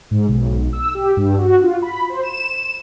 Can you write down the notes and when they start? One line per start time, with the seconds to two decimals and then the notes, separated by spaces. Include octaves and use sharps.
0.11 G#2
0.28 B1
0.73 E6
0.95 G4
1.17 G2
1.38 F#4
1.63 F4
1.82 B5
2.09 C5
2.23 E7